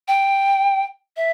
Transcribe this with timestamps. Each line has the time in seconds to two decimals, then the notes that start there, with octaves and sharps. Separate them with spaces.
0.08 G5
1.17 E5